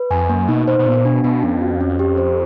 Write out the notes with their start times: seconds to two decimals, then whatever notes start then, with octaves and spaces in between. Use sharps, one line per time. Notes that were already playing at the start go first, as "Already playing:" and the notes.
Already playing: B4
0.10 F2 G#5
0.29 F#2 A#3
0.48 B2 D#4
0.67 B2 C5
0.79 B2
0.86 A#2 B3
1.05 B2 D4
1.24 B2 B3
1.43 F2 C#4
1.62 F#4
1.81 C#4
1.99 G4
2.18 C5